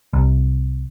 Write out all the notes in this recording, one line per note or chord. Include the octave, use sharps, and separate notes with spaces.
C2